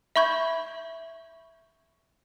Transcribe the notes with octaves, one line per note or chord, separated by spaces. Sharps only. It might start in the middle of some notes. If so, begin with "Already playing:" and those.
E5 B5 C#6 G6 G#6